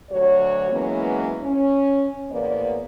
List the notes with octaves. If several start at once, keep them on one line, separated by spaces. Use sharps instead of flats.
D2 F#3 F#4 C#5
E3 F#3 G#3 A#3 B3 C#4
C#4
E2 A2 A#3 B3 C5 D5